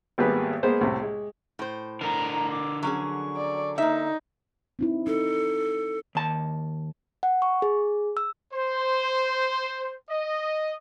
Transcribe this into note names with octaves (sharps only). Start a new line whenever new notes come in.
G#1 G3 A#3 B3 G#4 B4
G#3 A#3 B3 G#4 C5
C2 A2 C3
G#3
A2 C5
D3 A#4 A#5
D6
F#3 C#4 G#4 C#6
D5
A#3 D#4 E5
C4 D#4 E4
D#4 A4
D#2 A5
F#5
C#6
G#4
E6
C5
D#5